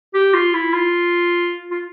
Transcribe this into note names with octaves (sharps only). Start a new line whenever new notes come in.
G4
F4
E4
F4
F4